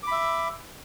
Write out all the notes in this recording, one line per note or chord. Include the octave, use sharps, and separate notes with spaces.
E5 B5 D6